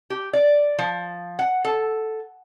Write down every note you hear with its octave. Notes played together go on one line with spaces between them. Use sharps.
G4
D5
F3
F#5
A4